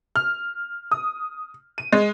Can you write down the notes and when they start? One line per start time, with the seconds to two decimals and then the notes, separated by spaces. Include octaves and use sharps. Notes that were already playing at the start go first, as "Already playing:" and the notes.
0.16 F6
0.91 D#6
1.78 D#7
1.93 G#3